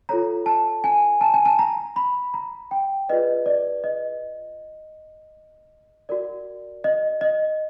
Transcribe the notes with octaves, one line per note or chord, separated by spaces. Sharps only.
F4 A4 C#5 A#5
A5
G#5
A5
G#5
A5
A#5
B5
A#5
G5
F4 G#4 B4 D5 D#5
D5
D#5
F#4 A#4 D5
D#5
D#5